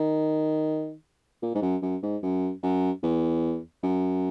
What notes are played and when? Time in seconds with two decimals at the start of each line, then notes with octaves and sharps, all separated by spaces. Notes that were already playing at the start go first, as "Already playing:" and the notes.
Already playing: D#3
1.42 A#2
1.55 G#2
1.62 F#2
1.82 F#2
2.03 G#2
2.23 F#2
2.63 F#2
3.03 E2
3.83 F#2